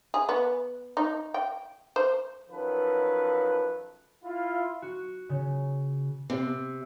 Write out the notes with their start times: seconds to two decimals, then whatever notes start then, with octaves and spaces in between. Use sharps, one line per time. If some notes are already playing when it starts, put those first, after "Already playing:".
0.14 G#4
0.29 B3
0.97 D#4
1.34 G5
1.96 C5
2.50 F#2 D#3 F3 A4 B4
4.23 E4 F4
4.82 F#4
5.29 C#3
6.30 C3